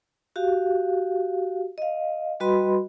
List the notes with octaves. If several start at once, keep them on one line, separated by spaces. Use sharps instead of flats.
F#4 G4 F5
D#5 F5
G3 F#4 B4 D#5 B5 C6